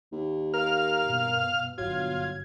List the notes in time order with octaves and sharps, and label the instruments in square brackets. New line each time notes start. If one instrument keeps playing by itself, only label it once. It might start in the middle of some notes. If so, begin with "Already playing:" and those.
[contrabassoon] D#2
[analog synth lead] A#4 [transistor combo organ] F5 F6
[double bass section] G2 B2
[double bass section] G1 [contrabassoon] F#3 [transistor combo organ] F4 [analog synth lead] G#6